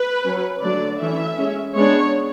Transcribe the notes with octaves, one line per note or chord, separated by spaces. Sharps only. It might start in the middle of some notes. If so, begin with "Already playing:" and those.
Already playing: B4
F#3 C#4
D3 F#3 A3 D4 D5
E3 A3 C#4 E5
G#3 C#4
G#3 B3 D4 C#5